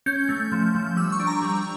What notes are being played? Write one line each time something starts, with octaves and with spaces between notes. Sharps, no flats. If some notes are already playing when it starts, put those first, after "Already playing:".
C#4 G6
A3
F3
F3
G3 E6
C#6
D4
A#5
G3